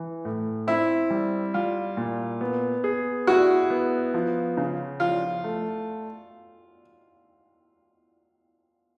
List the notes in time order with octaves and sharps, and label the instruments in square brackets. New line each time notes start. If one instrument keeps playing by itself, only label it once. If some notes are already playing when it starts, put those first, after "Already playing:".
Already playing: [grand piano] E3
A2
[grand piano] C4 [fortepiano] E4
[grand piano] G3
[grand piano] G3 [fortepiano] F4
[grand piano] A#2
B3
G#4
[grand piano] E4 [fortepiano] F#4
[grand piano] B3
F3
C#3
[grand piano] F3 [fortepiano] F4
[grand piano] A3